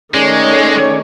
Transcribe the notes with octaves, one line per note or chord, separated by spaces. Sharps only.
D#3 G#3 A3 C#4 G#4 C#5 D5